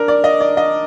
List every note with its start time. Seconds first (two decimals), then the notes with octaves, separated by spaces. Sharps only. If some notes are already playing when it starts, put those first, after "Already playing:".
Already playing: D4 A#4
0.08 D5
0.24 D#5
0.41 D5
0.57 D#5